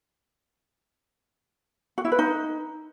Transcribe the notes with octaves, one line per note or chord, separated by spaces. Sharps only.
F#4
E4
B4
D#4